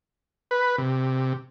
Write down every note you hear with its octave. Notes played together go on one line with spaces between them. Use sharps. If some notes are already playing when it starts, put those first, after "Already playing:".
B4
C3